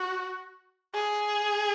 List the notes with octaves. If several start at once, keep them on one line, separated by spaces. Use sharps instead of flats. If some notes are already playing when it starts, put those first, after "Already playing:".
Already playing: F#4
G#4